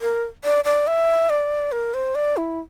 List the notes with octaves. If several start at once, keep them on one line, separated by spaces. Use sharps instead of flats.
A#4
D5
D5
E5
D5
A#4
C5
D5
E4